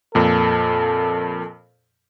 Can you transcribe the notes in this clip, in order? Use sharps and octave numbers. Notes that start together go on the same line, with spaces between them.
F2 A#2 A4